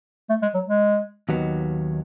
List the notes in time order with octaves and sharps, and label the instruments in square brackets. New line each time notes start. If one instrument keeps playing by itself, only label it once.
[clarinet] A3
G#3
F#3
G#3
[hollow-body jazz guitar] D#2 D#3 F#3 B3